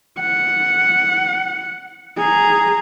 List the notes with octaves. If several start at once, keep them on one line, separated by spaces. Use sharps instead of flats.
F#5
G#4 A#5